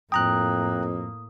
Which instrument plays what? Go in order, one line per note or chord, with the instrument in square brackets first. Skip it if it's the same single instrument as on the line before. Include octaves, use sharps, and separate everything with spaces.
[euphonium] F2 [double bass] A2 A#3 [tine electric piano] G5 A#5 F#6 [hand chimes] D#6